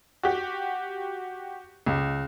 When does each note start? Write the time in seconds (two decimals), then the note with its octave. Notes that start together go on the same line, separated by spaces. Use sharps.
0.23 F#4 G4
1.86 C#2